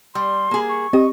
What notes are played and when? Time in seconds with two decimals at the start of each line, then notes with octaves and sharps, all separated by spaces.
0.15 G3 C6
0.51 A#3 G#4
0.69 C#6
0.93 C4 G4 D#5